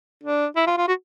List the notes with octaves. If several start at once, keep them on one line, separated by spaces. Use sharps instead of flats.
D4
E4
F4
F4
F#4